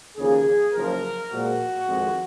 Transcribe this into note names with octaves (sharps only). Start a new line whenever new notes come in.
D#2 C#3 F3 A#3 G#4
F#1 F#2 F3 A#4
A#2 F3 G#3 F#4
F2 D#3 G#3